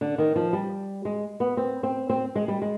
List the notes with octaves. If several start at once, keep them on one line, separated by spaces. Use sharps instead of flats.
D3
D#3
F3
G3
G#3
B3
C4
C4
C4
G#3
G3
G#3